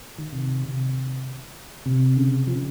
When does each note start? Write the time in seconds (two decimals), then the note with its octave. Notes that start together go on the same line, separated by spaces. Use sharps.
0.18 D#3
0.33 C3
0.48 C3
0.64 C3
1.86 C3
2.17 C#3
2.47 F3
2.55 C#3